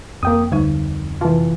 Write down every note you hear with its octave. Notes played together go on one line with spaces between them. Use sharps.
F2 A#3 G5 D#6
D2 D3 G3 D#4
C3 E3 F4 A5